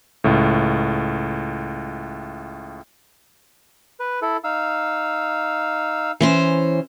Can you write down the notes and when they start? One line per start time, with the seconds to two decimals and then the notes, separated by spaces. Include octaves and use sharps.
0.24 C#2 A2
4.00 B4
4.22 E4 A4
4.44 D#4 F5 E6
6.20 E3 C#4 C5